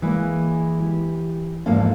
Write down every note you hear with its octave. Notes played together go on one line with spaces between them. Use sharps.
E3 G#3 A#3
G4
E2 G#2 F3 A#3 A4 F5